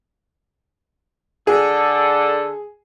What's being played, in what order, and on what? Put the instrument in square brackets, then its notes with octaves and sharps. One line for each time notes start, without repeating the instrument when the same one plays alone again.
[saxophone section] D3 [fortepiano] G#4 [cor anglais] A4